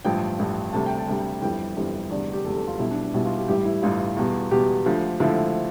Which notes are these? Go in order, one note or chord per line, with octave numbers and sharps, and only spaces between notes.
A1 G2 F3 G5
A1 G2 F3
D2 C3 G3 A5
G5
A5
D2 C3 G3
G1 F2 E3 G3 G5
G1 F2 E3 G3
F1 E2 D3 G3 D5
G4
F1 E2 D3 G3 A4
A4
F4
B1 B2 G3 E4
D4
D4
B1 B2 G3 E4
F4
G4
A1 G2 E3 G3 G4
E4
A1 G2 E3 G3 F4
E2 B2 G3
E2 B2 G3 G4
D2 D3 F3
D2 D3 F3 E4